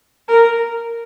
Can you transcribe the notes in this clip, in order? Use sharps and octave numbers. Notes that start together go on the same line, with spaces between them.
A#4